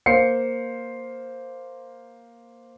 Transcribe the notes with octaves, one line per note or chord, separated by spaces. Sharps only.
A#3 C5 F5 C7 C#7